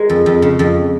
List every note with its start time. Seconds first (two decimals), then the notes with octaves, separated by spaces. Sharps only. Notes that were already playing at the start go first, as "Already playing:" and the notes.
Already playing: G#3 A#4
0.10 F2
0.26 F2
0.42 C#3
0.59 F2